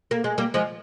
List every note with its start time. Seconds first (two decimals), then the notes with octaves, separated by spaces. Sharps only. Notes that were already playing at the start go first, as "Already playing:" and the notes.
0.11 A#3
0.24 G#3
0.38 G3 A#3
0.54 F3 G#3